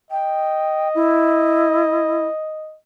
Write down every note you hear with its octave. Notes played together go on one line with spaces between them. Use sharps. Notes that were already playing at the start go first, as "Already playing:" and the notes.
D#5 G5
E4